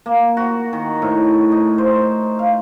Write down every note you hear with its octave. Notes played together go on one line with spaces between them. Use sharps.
A#3
F#4
D#3
A2
D#4
C5
F5